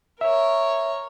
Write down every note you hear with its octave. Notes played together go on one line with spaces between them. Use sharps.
A#4 C#5 E5